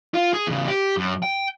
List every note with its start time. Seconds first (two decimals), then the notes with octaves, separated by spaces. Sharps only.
0.14 F4
0.33 G#4
0.47 E2 C#3
0.68 G4
0.97 F#2
1.22 G5